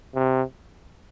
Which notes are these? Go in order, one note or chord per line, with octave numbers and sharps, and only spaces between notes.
C3